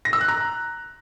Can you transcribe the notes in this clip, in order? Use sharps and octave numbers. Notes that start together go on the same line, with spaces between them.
A#6
E6
F#6
A#5